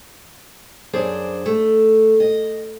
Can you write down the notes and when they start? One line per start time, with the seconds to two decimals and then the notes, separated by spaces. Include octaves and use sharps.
0.93 F#2 D4 G#4 C5 D5
1.46 A3
2.20 D#5